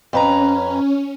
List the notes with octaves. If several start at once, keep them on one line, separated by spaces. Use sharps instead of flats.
F2 C#4 B4 A#5